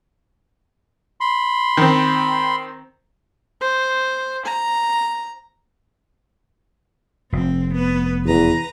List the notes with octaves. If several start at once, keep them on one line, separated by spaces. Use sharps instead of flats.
B5 C6
D#3 C4
C5
A#5
F1 C4
B3 B4
E2 B4 A#5